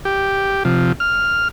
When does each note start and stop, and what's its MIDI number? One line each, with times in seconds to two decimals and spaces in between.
0.05 0.63 67
0.65 0.92 48
0.65 0.92 53
1.00 1.48 89